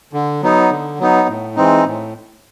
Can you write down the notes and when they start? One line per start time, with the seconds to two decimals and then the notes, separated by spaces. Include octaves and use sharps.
0.13 D3
0.42 F#3 B3 D#4
0.71 D3
0.99 F#3 B3 D#4
1.28 A2
1.56 E3 G#3 C4 D#4
1.85 A2